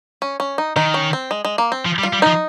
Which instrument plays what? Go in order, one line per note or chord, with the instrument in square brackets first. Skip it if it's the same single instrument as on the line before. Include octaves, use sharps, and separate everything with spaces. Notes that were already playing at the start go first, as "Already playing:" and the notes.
[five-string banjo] C#4
C#4
D#4
[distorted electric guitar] D#3 [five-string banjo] D#4
[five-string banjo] C#4
C4
G#3
G#3
A#3
C4
[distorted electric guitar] F3
G3
[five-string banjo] F4
[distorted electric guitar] G3
[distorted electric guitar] F3 [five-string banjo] D#4